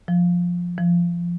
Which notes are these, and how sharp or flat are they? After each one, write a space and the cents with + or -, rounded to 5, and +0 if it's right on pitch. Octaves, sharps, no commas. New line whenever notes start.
F3 +10
F3 -15